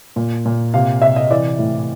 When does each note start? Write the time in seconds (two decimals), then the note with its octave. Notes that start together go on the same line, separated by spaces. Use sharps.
0.16 A#2
0.46 A#2
0.74 C3 F5
1.02 C3 E5
1.16 D#5
1.31 E3 D5
1.59 A2